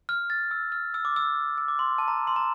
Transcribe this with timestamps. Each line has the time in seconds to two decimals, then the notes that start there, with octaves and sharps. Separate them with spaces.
0.09 F6
0.30 A6
0.51 E6
0.72 F6
0.94 E6
1.05 D6
1.16 E6
1.58 E6
1.68 D6
1.79 C6
1.98 A5
2.08 A#5
2.27 C6
2.36 A#5